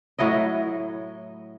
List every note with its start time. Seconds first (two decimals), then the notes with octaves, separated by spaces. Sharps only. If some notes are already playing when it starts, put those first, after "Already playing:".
0.19 A2 F#3 E4 D#5